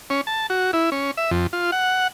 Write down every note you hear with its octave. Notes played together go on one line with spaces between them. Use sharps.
C#4
A5
F#4
E4
C#4
E5
F2
F4
F#5